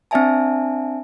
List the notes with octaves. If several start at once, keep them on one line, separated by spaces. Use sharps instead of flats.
C4 D4 D5 E5 G#5 A5